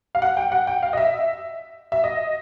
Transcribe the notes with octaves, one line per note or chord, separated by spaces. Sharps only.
F5
F#5
G5
F#5
G5
F5
D#5
E5
E5
D#5